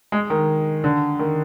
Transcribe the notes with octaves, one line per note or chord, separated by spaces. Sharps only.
G#3
D#3
D3
D#3